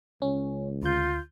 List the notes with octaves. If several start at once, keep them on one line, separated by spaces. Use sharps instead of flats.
C#2 C#4
D2 F4 G6